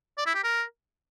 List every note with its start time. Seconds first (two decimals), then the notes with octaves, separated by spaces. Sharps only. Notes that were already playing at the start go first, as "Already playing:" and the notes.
0.17 D5
0.26 E4
0.35 G4
0.44 A#4